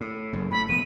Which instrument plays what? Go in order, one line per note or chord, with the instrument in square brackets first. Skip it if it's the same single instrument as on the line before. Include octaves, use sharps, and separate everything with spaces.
[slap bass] A2
F#1 F#2
[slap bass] A2 A3 [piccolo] B5
[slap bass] E1 F3 B3 [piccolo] D#7